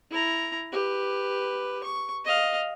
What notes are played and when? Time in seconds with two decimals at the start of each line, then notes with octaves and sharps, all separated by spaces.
0.11 E4 A#5
0.72 G4 B4
1.84 C#6
2.25 D#5 F5